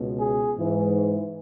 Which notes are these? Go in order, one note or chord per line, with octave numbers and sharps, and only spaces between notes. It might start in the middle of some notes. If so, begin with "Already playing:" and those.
Already playing: C#2 B2
G#4
G#2 E3